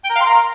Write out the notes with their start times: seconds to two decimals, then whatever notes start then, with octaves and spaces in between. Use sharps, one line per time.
0.04 G5
0.10 A#4
0.15 F5
0.21 C6
0.26 A#4